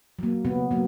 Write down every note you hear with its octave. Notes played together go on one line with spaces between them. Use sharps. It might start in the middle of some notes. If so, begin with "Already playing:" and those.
F#3 A#3
C#3 B3
F#3 A#3